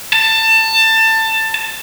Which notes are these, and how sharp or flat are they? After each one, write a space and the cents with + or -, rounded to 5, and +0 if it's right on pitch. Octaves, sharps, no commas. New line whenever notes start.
A5 +20